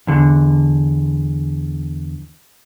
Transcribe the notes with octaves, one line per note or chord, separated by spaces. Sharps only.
E2 D3